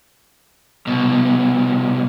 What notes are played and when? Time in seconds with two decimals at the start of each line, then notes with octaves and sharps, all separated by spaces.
0.87 C2 B2